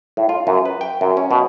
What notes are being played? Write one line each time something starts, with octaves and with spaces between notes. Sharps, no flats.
A2
F4
F#2
B4
G5
F#2
C#4
B2